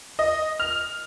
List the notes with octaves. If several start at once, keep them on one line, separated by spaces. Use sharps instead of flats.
D#5
F6